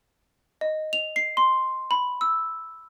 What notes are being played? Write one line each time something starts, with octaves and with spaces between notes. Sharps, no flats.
D#5
F7
C7
C6
B5
E6